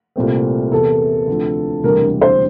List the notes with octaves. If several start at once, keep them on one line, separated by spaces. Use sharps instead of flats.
C2 A#2 A3 C4
E2 C3 E3 A#3 E4 A4
D2 C3 F3
E1 D2 C3 E3 G3 A#4
C5